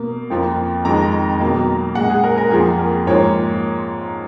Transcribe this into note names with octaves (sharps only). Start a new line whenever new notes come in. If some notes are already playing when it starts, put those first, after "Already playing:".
Already playing: B2 A#3
F2 F3 A#3
F2 D#3 G#3 A#5
B2 F#3 A#3
A#2 G#3 F#5
G#4
A#4
A#4
F2 F3 A#3 G#4
A#4
G#2 F3 A#3 C#5